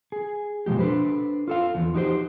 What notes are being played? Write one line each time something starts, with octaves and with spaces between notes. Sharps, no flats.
G#4
F#2 B2 F3 G#3 G4
D4 A4 B4 C5
F4 A4 F5
E2 F3
D#4 F#4 G4 B4 C5